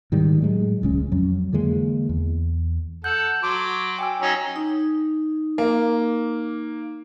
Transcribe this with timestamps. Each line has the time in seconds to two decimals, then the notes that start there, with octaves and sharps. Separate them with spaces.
0.12 G#2 D#3 G3
0.42 A2 F#3 G#3
0.82 D#1 C#2 G#3 C#4
1.12 F2 F#3
1.53 D3 E3 G#3 A#3
2.09 E2
3.04 A4 F#5 G6
3.43 F#3 C6 D6
3.99 G5 G#5 E6
4.22 F#3 C#4 D#4
4.56 D#4
5.58 A#3